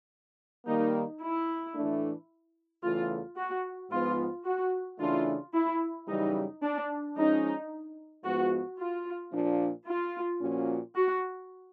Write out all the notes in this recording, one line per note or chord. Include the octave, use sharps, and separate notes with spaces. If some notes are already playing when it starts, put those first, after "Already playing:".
D#3 G3 A#3 D#4
E4
A2 E3 A3 D4
E2 C#3 E3 A3 F4
F#4
G#2 F3 G#3 B3 F4
F#4
C#3 E3 A3 D4 F4
E4
F#2 C#3 E3 G3 D#4
D4
F3 G#3 C#4 D#4
G#2 F3 G#3 B3 F#4
F4
A#2 F3 A#3 D4
F4
A#2 F3 A#3 C#4 F#4
F#4